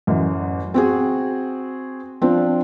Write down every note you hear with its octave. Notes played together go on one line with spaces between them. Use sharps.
A1 F#2
C4 F#4 G#4
F3 C4 D4